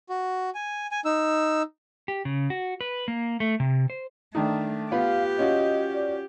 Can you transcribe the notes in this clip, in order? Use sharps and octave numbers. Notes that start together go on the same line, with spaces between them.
F#4
G#5
G#5
D#4 E6
G4
C#3
F#4
B4
A#3
A3
C3
C5
D#3 A3 D4 D#4
B3 F4 G4 B4 F5
C#4 F4 F#4 D#5
D5